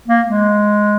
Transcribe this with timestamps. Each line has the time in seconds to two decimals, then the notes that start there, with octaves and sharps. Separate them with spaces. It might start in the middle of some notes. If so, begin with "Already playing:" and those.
0.08 A#3
0.27 G#3